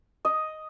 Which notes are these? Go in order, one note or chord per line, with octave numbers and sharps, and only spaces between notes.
D#5